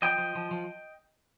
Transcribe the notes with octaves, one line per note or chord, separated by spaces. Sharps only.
F3 D#5 G5
F3
F3
F3